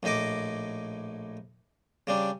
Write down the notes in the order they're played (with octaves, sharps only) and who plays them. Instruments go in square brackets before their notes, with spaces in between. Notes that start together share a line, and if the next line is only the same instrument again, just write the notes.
[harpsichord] A#1 A2 D#4 D#5 D6
C#3 G3 D4